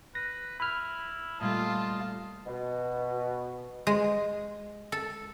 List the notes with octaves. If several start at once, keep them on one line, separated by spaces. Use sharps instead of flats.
B4 A#6
E4 B5 F6
A#2 G3 A3 F4 D#5 A5
B2
G#3
A4